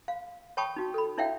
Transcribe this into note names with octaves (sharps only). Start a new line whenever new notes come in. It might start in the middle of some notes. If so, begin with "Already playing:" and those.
F5
C#5 G5 A5 B5 C#6 D#6
D#4 F#4
A4 B5
D4 E4 C#5 E5 F5 G5